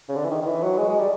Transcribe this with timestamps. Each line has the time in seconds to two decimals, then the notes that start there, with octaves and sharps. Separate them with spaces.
0.09 C#3
0.16 D3
0.25 E3
0.31 D#3
0.42 D#3
0.47 E3
0.63 F#3
0.78 G#3
0.89 G#3
0.99 G3